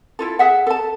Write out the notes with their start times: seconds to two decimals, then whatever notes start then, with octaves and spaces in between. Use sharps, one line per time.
0.19 E4 F4 A4
0.39 G#4 E5 F#5
0.67 A4 A5